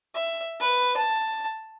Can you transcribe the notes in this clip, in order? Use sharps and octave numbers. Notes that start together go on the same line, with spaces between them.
E5
B4
A5